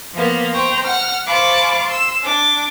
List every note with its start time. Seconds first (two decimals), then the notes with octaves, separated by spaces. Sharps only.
0.14 F3 A#3 B3
0.53 C5 G5 A#5 C#6
0.84 F#5 F6
1.26 C5 F5 A5 B5 C#6 D6
1.87 C6 E6
2.23 D4 D6